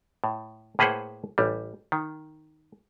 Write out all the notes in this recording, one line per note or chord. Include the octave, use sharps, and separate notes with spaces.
A2
A2 A#3 G#4 B4 C5 F#5
A1 G3
D#3